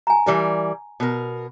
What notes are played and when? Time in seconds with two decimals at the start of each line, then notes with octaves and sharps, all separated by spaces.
0.07 G#5 A#5
0.26 E3 G3 A#4
1.00 B2 A#4